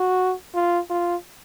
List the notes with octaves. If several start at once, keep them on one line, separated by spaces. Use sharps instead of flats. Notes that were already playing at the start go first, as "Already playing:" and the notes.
Already playing: F#4
F4
F4